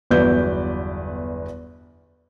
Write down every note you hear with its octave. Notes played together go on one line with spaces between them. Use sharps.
G1 E2 F#3 B4 D5 G6